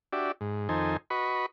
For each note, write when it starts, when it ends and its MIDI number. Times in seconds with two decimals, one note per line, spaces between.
0.13 0.32 62
0.13 0.32 66
0.13 0.32 67
0.13 0.32 74
0.13 0.32 76
0.41 0.68 44
0.69 0.97 41
0.69 0.97 51
0.69 0.97 63
0.69 0.97 69
0.69 0.97 72
0.69 0.97 80
1.10 1.46 66
1.10 1.46 71
1.10 1.46 75
1.10 1.46 83
1.10 1.46 85